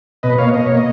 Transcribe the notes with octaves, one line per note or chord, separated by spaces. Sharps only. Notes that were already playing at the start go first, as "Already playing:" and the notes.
B2 B4 D#5
A#3 C#5 F5
B2 D#5
A#3 C#5
D#5